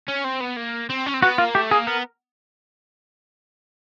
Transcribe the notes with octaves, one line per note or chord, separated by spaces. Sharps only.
C#4
C4
B3
A#3
C4
C#4
C4
B3 F#4
A#3 F4
A3 G4
A#3 G#4
B3 A#4